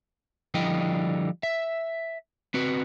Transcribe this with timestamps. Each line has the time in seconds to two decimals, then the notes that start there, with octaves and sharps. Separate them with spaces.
0.54 D3 F3 G3 E4 D#5 G5
1.43 E5
2.54 C4 F#4 B4